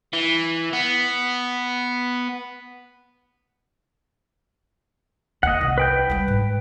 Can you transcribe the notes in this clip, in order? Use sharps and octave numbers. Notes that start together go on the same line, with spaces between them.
E3
B3
D#2 D#5 F#5
C2
B4 G5 G6
F#3 G3
G#2